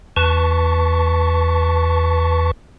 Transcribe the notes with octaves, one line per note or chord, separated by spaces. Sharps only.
E2 B4 A5 C#6